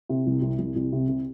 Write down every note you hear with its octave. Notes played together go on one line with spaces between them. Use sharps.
C3
C2
C2
C2
C2
C3
C3